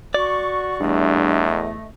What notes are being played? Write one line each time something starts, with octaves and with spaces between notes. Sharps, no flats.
F#4 D5 C#6
E2 G2 A3 D#5